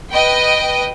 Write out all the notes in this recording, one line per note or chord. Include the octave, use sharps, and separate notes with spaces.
B4 D#5 G5